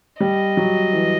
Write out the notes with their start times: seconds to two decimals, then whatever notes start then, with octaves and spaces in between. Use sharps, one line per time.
0.20 G3 D#5
0.57 F#3
0.93 E3